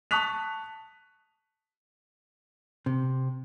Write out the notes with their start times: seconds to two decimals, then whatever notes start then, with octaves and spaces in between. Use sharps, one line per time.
0.11 A5 C#6 D#6 F#6 B6 F7
2.86 C3